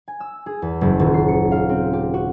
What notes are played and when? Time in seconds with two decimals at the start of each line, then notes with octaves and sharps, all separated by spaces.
0.08 G#5
0.20 E6
0.46 G#4
0.62 E2
0.81 F#1
0.99 D#1
1.14 C7
1.28 C#7
1.52 F5
1.69 C4
1.93 G4
2.14 F#4